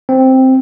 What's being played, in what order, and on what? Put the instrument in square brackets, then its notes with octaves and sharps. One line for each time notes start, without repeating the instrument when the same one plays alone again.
[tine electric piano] C4